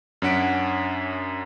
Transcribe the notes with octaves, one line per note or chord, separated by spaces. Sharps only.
F#2 C#4 D4 F#5 B6 D7